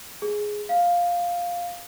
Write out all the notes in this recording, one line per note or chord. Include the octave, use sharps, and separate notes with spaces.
G#4
F5